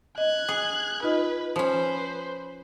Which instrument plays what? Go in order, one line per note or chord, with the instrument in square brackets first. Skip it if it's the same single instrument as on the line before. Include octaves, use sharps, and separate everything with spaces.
[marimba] D#5 [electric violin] F#6 G#6
[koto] G#4
[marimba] D#4 F4 D#5 [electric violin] B4
[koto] F3 C#4 [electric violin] B4 C5